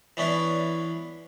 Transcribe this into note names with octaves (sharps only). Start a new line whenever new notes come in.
E3 B3 C#4 D4 E4